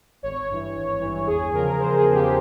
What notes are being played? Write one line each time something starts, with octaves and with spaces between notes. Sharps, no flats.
G#1 C#5
G2 E3
G#1
G2 E3
E2 G#4
C#3 F3 A#4
E2 C5
G#4
C#3 F3
G4